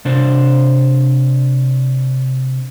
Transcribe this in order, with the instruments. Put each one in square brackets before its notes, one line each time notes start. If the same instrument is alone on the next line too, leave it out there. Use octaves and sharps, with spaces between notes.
[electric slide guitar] C3 D4 C5